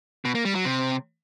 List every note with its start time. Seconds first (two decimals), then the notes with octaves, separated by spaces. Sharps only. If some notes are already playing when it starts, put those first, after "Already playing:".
0.25 B2
0.35 A#3
0.45 G3
0.55 F#3
0.65 C3